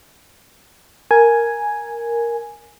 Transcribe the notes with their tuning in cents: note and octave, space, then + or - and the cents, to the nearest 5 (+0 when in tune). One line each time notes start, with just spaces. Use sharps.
A#4 +0 G#5 +0